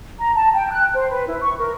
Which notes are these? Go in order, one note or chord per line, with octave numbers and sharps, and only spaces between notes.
A#5
A5
G5
F#6
C5
B4
E4
C#6
A#4